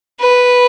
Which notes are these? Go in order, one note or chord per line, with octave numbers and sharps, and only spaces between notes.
B4